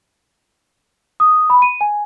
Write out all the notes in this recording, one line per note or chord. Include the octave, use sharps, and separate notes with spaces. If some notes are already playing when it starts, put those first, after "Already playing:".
D#6
B5
D#7
G#5